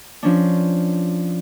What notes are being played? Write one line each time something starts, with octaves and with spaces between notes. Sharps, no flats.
F3 C#4 D4